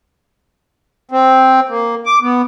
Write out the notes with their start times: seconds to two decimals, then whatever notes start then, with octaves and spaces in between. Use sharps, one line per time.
1.11 C4
1.69 A#3
2.06 D6
2.22 B3